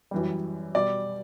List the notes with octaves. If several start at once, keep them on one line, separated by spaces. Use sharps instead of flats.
F#2 E3 G3
B2 G3 D5